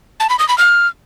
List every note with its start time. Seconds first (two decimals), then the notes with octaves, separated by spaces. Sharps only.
0.20 A5
0.29 B5
0.39 D#6
0.49 B5
0.58 F6